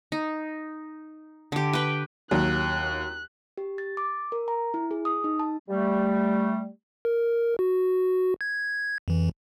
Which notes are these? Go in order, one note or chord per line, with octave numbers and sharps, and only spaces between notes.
D#4
D3 G4
B4 G5
D#2 F#3 F#6
G4
A6
D6
A#4
A#5
E4
G#4
D#6
D#4
A5
G3 A3
A#4
F#4
G#6
F2 E3